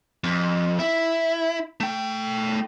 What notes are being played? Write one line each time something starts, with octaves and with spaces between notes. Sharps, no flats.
F2
E4
A3 G5